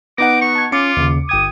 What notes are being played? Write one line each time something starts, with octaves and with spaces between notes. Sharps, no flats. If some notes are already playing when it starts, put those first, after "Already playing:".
B3 D#4 F#5 D6 A#6
C#6
A5 G#6
C#4 F4 D6 C#7
D#2 C#3
G1 G5 D#6 G#6